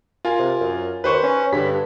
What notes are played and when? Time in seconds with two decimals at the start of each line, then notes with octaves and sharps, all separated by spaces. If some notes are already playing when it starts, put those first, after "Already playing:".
0.25 F4 A#4 G#5
0.39 C3
0.61 F#2
1.04 D#2 B4 C5 C#6
1.23 C#4
1.53 G2 D3 B6